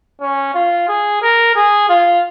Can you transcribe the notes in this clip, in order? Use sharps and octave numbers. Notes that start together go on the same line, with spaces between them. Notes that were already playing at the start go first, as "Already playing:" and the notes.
C#4
F4
G#4
A#4
G#4
F4